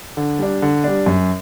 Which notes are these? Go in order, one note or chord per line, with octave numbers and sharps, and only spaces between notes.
D3
G3 D4
D3
G3 D4
F#2